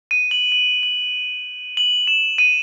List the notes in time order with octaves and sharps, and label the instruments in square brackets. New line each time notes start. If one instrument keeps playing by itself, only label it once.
[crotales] D#7
F#7
F#7
F#7
F#7
E7
D#7